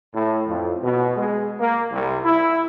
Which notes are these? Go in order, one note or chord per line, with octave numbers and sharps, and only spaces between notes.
A2
F2
B2
G#3
A#3
C2
E4